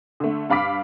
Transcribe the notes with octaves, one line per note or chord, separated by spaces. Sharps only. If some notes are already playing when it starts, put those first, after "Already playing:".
D3 A3
G2 F5 B5 D6 B6